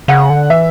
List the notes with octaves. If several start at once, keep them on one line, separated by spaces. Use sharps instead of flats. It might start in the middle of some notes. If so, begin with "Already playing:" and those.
C#3 F#5
D3
E3 E5